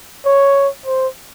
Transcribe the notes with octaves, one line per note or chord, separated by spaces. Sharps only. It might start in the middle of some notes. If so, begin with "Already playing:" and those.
C#5
C5